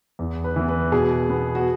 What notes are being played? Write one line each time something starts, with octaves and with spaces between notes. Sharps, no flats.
E2
B4
E3 B3
B4
B2 G#4
B3
F#4